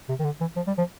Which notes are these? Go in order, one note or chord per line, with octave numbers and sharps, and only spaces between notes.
C3
D#3
D3
E3
F3
G3
F3